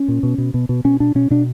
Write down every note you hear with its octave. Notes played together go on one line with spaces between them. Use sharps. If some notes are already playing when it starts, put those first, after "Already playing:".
Already playing: C#4
A#2
B2
B2
B2
B2
B2 C#4
B2 D4
B2 C#4
B2 D4